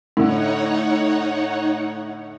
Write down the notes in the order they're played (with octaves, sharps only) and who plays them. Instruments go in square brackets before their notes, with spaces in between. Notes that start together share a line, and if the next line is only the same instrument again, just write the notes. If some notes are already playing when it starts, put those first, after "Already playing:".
[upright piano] A2 D3 [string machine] D#4 C#5 F#5